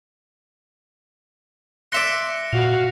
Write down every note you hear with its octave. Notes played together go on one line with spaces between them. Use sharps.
D5 E5 C6 F#6 A#6 C#7
A#2 F#4 F5 F7